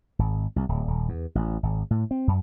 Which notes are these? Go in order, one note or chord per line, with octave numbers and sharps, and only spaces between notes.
G#1
C2
D1
D#1
E2
A1
G#1
A2
C4
F#2